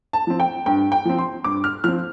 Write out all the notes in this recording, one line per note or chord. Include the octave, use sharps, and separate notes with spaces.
A5
F3 C4
G5
G2 G5
G5
F3 C4
C6
G2 D6
F6
F3 C4 F6